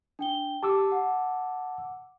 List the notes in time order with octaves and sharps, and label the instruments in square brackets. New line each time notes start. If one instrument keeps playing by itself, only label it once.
[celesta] D4 G5 G7
[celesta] G4 [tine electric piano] A5 D6 E6
[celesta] F#5